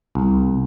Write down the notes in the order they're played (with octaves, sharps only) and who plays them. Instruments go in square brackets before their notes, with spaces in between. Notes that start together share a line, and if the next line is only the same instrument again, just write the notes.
[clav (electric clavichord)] C2